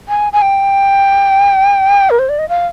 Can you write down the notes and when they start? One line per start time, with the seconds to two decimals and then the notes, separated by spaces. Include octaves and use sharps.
0.09 G#5
0.33 G#5
0.42 G5
2.10 A#4
2.19 C5
2.29 D5
2.39 D#5
2.49 F5